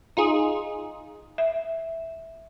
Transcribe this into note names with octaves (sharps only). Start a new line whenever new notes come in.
D#4 F4 G#4
E5